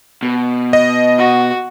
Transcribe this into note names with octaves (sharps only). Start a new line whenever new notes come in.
B2
D#5
F#4